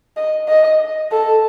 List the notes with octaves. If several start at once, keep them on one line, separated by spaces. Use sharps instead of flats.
D#5
D#5
A4